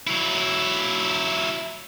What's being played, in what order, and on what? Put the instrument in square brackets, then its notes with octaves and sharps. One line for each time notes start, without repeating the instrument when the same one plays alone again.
[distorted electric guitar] F#3 E4